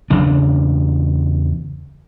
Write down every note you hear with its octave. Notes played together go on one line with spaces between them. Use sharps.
E2 C#3 D4